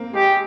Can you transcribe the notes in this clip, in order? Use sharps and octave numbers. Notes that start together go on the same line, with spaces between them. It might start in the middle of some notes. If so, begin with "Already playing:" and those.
Already playing: A#3 C4
G#3 G4